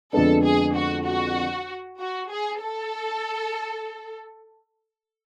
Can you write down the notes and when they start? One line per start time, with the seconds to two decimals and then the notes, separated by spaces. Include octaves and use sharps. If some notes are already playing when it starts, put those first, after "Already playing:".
0.13 F2 D3 G#3 B3 D4 A4
0.44 G#4
0.75 F#4
1.06 F#4
1.99 F#4
2.30 G#4
2.61 A4